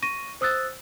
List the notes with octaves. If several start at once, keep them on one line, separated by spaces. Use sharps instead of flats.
C#6 A#6 D#7
C5 D#6 E6 F#6 A6